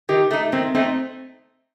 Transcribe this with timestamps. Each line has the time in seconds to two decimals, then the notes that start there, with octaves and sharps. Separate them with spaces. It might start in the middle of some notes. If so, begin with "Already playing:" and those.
0.09 D#3 G4
0.31 A3 D#4
0.52 D#3 C4
0.75 A3 C4 D#4